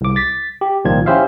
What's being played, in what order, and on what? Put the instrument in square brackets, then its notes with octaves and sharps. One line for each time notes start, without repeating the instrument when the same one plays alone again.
[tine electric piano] C2 D6
A6 B6
G4
C2 A#2 D#3 F3 F4 G#6
C#4 E4 G4 C5 E5 F5